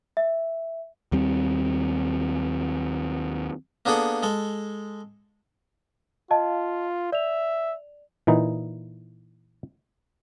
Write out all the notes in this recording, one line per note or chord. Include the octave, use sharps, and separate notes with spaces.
E5
D#2 G3 C4
A#3 B3 D4 G#4 A4 F#5
G#3 A4
F4 D#5 F5 A5
D5 E5 F7
A#2 E3 D#4